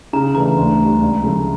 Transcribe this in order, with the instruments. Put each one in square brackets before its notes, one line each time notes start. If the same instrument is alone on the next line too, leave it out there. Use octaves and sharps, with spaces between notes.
[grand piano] C#3 [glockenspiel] A#5
[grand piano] E3 A3 D4 [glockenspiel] A#5
[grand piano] D2
D3 G3 D4
C#2
C#3 F3 A3 D4